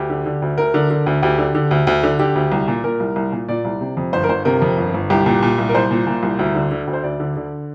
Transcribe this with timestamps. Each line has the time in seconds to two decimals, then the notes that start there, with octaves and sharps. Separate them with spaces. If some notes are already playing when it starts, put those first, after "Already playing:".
Already playing: D2 G4
0.10 D3
0.26 D3
0.42 D2
0.58 D2 A#4
0.74 D3
0.90 D3
1.06 D2
1.22 D2 G4
1.38 D3
1.55 D3
1.71 D2
1.87 D2
2.03 D3
2.19 D3 G4
2.35 D2
2.52 C2
2.68 A#2
2.84 A#2 A#4
3.00 C2
3.16 C2
3.32 A#2
3.49 A#2 D5
3.65 C2
3.81 C3
3.97 F2
4.13 G1 C5
4.24 A#4
4.29 G1 C5
4.45 C3 A#4
4.62 F2
4.78 G1
4.94 G1
5.10 C2 G4
5.26 A#2
5.42 A#2
5.58 C2
5.69 A#4
5.75 C2 C5
5.91 A#2
6.07 A#2
6.23 C2
6.39 D2
6.55 D3
6.71 D3
6.87 D2
6.93 C5
7.03 D2 D5
7.20 D3
7.37 D3